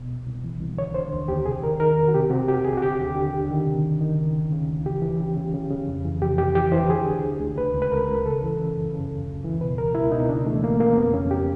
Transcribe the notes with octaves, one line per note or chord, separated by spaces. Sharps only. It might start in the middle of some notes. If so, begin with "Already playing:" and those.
Already playing: B2
C2
C2
E3
C2
D3 C#5
D3 C5
D#2
D#2 G4
C3 G#4
D#3 A#4
D#3 A#4
E2
F#4
C3 G4
C3 F#4
C3 G4
C2 G#4
F#4
D3 G4
D#2
D3
D3
D#3
C3
C#2
D#3
C#3
D2
C#3
D2
E3 G4
E3
C#3
C#3
C#3
C#3
F2
E3
F2 G4
C3 G4
E3 G4
E3 C5
D3 G#4
D3
D2
D2
C#2 B4
C#2
B4
C#2 A#4
C#2
C#3 A4
E3
C#3
F#2
C#3
D2
D2
E3
B2 B4
C#2 A#4
C#2 E4
B2 D#4
C#3 D4
E3 A3
D2 A#3
C#3 A#3
F2 B3
F2 C#4
G4